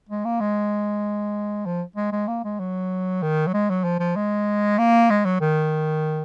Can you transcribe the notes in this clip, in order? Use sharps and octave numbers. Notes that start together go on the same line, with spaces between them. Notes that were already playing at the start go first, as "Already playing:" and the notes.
G#3
A#3
G#3
F3
G#3
G#3
A#3
G#3
F#3
D#3
F#3
G#3
F#3
F3
F3
G#3
A#3
G#3
F#3
D#3